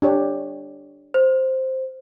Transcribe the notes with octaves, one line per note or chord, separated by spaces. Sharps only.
D4 G4 C#5
C5